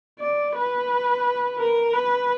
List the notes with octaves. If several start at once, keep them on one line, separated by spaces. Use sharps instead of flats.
D5
B4
A#4
B4